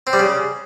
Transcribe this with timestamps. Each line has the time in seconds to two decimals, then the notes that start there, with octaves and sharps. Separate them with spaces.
0.07 C4
0.13 G3
0.19 C#3